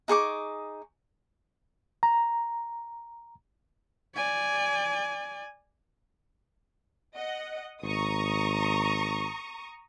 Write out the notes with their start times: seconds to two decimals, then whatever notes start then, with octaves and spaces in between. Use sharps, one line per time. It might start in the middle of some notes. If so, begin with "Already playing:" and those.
0.08 D#4 G#4 C#6 D6
2.03 A#5
4.15 D5 G#5
7.15 D#5 F#5
7.83 G#1 A#5 C#6 D#6